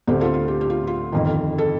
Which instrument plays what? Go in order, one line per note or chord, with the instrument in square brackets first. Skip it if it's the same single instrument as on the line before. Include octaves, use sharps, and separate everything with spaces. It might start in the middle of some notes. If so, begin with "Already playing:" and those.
[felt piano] D2 D3 A3 C4 G4
F4 A4
F4
G4
G4
F4
F4
G1 F2 D#3
A4